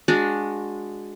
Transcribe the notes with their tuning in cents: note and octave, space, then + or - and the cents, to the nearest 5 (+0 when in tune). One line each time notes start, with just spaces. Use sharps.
G#3 +0 D4 +0 F#4 -25